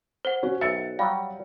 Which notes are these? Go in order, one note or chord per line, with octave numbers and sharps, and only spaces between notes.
C5 F#5
C#4 F#4
B1 E5 A6 C#7
F#3 G3 F5